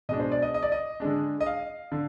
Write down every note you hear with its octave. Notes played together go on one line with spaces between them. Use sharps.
B2 G#3 D4 D#5
C5
D5
D#5
D#5
D5
D#5
D3 G#3 D4
D#5
F5
D3